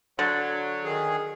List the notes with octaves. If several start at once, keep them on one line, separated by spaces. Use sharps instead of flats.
D3 F#3
D#3 G#4